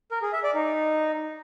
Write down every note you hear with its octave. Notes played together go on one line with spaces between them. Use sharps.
A#4
G#4
E5
D5
D#4